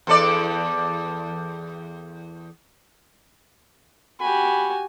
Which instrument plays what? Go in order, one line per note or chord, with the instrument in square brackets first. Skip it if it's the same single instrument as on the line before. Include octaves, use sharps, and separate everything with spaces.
[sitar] E2 A4 D5
[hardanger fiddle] F#4 G4 [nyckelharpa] G#5 [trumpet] B5